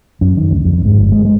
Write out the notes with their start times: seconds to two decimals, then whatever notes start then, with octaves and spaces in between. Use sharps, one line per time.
0.21 F#2
0.37 D#3
0.51 D2
0.65 F2
0.85 G#2
0.97 G1
1.12 G#3
1.25 G#3